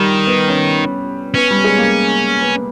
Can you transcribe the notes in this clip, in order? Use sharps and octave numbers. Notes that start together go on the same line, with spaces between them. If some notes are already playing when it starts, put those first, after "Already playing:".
Already playing: D#3 G3
B3
C#4
B3 C#4
G3
G#3
A#3
B3